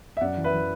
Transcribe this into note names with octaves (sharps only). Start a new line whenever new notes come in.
E5
F#2 D5 F#5
E3
B4 E5
E3